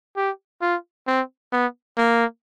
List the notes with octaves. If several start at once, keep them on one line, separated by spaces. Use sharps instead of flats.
G4
F4
C4
B3
A#3